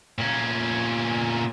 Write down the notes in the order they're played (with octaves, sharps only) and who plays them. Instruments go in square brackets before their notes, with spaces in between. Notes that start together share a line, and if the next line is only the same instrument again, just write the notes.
[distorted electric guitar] A#2 C#4